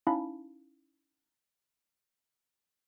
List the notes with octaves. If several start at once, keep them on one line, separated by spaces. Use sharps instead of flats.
C#4 D#4 E4 F5 A5 B5